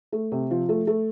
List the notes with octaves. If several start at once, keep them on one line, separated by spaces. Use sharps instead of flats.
A3
C3
F3
A3
A3